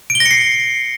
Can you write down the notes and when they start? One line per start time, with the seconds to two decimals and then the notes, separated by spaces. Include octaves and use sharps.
0.10 D7
0.15 G7
0.20 A#6
0.26 C#7
0.31 C7